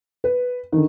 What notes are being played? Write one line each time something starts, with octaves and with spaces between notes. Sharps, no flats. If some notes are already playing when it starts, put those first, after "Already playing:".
B4
D3 D#3